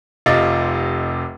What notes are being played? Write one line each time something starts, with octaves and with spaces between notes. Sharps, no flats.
F1 C3 F4 D#5 A6